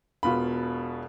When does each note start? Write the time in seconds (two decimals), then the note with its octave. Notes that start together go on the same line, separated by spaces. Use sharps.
0.23 E1 B2 F4 B5